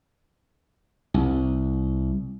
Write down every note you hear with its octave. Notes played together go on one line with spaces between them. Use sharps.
C2